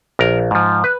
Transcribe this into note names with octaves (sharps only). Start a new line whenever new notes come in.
A#1 A#4
G#2 F3
B4